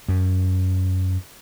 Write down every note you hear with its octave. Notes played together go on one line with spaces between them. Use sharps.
F#2